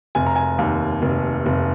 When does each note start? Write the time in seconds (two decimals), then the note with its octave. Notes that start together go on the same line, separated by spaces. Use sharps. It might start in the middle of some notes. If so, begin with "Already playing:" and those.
0.15 F1 G#5
0.26 A#5
0.36 G#5
0.58 D#2
1.02 F1
1.46 F1